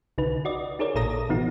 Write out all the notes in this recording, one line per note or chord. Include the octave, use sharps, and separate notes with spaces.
C2 D3 D#4 B4
F#4 D5 D#5
D#4 G#4 A#4 C#5 D5
A1 A#2 A4 A#5 D#6 A#6
A#2 E3 B3 D#4 F#4